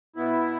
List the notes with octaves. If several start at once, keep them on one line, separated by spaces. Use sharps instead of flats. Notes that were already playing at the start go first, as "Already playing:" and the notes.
B2 B3 E4